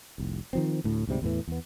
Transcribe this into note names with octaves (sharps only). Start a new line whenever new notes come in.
F1 C2
D#3 F3 C4
D2 A2
D2 G#2 C3 G3
E2 A2 E3
E2 B3